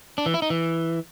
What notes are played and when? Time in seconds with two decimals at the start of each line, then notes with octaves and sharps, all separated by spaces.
0.18 D4
0.26 E3
0.34 E4
0.42 D#4
0.50 E3